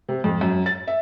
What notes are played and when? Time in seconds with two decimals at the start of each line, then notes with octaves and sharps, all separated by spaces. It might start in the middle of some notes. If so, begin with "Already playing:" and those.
0.09 C3
0.24 F2
0.41 F#2
0.66 A6
0.87 E5